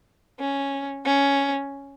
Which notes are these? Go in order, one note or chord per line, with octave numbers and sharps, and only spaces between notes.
C#4
C#4